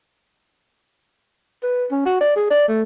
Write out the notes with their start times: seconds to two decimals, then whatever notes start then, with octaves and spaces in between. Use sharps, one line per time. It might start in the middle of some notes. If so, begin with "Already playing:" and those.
1.63 B4
1.92 C#4
2.06 F#4
2.21 D5
2.36 G#4
2.51 D5
2.68 A3